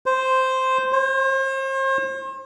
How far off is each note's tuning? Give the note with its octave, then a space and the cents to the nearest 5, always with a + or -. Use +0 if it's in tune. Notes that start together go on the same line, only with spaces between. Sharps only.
C5 -5
C5 +40